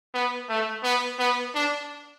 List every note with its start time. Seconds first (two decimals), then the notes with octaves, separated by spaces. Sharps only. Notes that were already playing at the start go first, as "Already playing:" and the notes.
0.14 B3
0.49 A3
0.84 B3
1.19 B3
1.55 D4